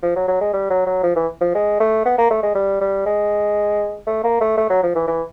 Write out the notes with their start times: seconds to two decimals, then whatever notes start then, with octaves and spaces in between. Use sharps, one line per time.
0.03 F3
0.16 F#3
0.28 F#3
0.41 G#3
0.54 G3
0.70 F#3
0.87 F#3
1.03 F3
1.16 E3
1.41 F3
1.55 G#3
1.80 A3
2.05 B3
2.18 A#3
2.31 A3
2.43 G#3
2.55 G3
2.81 G3
3.06 G#3
4.07 A3
4.24 A#3
4.41 A3
4.58 A3
4.70 F#3
4.83 F3
4.96 E3
5.08 E3